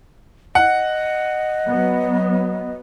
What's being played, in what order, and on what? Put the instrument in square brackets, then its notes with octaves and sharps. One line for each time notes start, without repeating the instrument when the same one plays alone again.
[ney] D#5 [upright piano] F#5
[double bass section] F#3 B3